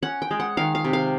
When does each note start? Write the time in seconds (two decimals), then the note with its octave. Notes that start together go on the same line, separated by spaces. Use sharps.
0.03 C#4 F#5
0.22 G5
0.31 G#3
0.40 F#5
0.57 D#3 F5
0.75 F5
0.84 C3
0.93 F5